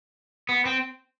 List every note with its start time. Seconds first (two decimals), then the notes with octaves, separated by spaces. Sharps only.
0.49 B3
0.65 C4